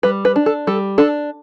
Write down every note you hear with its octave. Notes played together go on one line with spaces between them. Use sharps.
G3 B4
B4
D4
A4
G3 A4
D4 A4